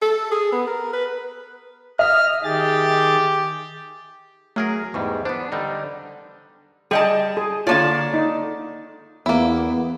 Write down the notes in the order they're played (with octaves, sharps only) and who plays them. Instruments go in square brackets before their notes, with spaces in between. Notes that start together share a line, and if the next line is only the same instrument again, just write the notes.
[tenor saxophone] A4
G#4
B3
A#4
B4
[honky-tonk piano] D#5 E5 D#6 [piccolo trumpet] F6
[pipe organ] D#3 G#4 A6 [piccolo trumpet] G4
[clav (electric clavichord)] F#3 G#4 A#4 [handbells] A3 F6
[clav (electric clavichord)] E2 G#2 G3 [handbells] C#6
[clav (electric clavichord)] B3 D4 [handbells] C5
[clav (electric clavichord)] D3 G3 D#4
[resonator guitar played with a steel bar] G3 D#5 A5 [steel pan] G#4 G5
[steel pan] G#4
[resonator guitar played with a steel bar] D3 A#3 D5 [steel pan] F4 C#5 A5
[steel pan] D#4
[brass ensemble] E2 [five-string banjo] A#3 E4 [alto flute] B3